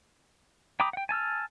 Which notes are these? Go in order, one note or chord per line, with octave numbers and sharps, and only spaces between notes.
G5 A#5 B5 D6 D#6
F#5 G5
G#5 A5 E6 F6